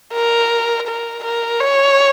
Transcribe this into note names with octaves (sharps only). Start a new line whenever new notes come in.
A#4
A#4
A#4
C#5